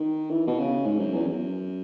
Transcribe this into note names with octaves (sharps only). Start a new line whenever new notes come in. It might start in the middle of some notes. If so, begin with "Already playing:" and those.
Already playing: D#3
E3
B2
C#3
G#2
F#2
E2
F#2